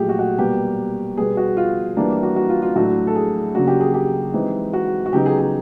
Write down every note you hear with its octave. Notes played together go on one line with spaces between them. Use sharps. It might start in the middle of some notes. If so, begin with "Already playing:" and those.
Already playing: A#2 F#3 A3 G4 G#4
F#4
F#4
B2 G3 A#3 G4
B2 G3 B3 G#4
F#4
F4
E3 G3 A#3 D4
F#4
F#4
F4
F4
A2 F#3 A3 D4 F#4
A4
G#4
C#3 F#3 A#3 D4 F#4
G4
G#4
G4
E3 G#3 C4 D#4
F#4
F#4
C#3 F#3 B3 D#4 G4
G#4
G#4